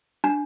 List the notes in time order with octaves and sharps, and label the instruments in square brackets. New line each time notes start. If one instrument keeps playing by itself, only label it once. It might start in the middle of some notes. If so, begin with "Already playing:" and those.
[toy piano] D4